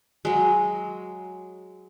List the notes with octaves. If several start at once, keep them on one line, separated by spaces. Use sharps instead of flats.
F#3 G#3